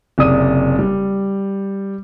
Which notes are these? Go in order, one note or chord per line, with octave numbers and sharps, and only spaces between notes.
F#1 C3 D5 D#6 D#7
G3